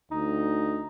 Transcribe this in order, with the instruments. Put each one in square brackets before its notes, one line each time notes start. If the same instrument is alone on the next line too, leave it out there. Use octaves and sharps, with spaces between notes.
[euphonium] D2 [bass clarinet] D#4